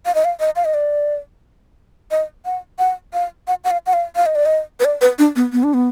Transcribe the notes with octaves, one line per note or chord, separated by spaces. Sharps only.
F5
D#5
F5
D#5
F5
D#5
D5
D#5
F#5
F#5
F5
F#5
F#5
F5
F#5
F5
F5
D#5
D5
D#5
B4
D5
B4
D4
B3
B3
D4
B3